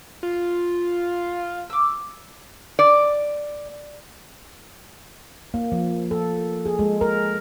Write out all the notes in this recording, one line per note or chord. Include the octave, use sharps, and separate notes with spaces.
F4
D6 E6
D5
A#3
F3
A4
G#4
G#3
A#4